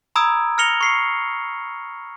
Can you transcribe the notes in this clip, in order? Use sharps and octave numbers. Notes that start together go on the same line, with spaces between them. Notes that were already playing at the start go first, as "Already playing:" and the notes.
A#5 B5 D#6 E6 G#6 D7
F6 A#6 C#7 F7 G7
C#6 C7 C#7